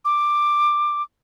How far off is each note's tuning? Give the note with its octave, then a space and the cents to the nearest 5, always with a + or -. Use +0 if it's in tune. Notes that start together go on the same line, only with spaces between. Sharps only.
D6 +10